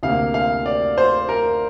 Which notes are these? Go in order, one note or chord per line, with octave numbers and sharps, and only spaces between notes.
D2 C3 A#3 F5
F5
D5
C5
A#4